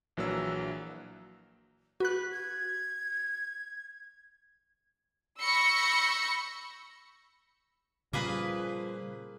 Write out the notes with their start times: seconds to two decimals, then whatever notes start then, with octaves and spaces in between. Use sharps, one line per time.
0.17 A#1 E3 F#3 A#3 D4 E6
2.00 F#4 B4 F#6
2.32 G#6
5.42 B5 C#6 E6 G6 A#6 C#7
8.13 A#2 C#3 F3 G3 A#3 G#4 B4